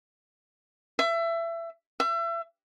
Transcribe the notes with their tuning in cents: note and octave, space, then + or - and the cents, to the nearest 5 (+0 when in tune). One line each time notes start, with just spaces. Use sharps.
E5 +25
E5 +35